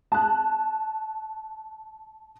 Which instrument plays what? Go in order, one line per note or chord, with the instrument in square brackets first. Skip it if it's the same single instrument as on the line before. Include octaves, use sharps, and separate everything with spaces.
[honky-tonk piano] A5 F#6